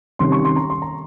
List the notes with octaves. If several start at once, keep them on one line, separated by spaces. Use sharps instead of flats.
C3 D#3 G3 C#4 C6
C#6
C6
A#5
C6
A#5